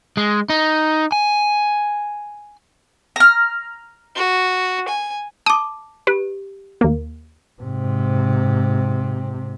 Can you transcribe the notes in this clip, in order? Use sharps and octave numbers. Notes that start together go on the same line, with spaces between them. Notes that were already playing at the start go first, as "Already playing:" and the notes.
G#3
D#4
G#5
A#5 F6
F#4
G#5
A5 D6 D#6
G4 B4
D#2 A#3
G#2 C3